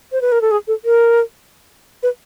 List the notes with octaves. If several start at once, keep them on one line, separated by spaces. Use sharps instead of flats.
C5
B4
A#4
A4
G#4
A4
A#4
B4